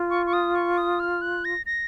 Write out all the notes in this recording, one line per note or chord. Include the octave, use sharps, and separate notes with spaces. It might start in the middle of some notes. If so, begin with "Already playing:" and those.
Already playing: F4
C#6
C#6
D#6
C#6
D#6
F6
F#6
A#6
A#6